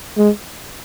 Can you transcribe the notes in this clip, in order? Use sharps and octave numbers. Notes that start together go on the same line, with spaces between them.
G#3